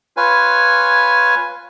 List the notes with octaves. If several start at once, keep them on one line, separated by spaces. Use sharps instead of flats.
F4 B4 C#5 G#5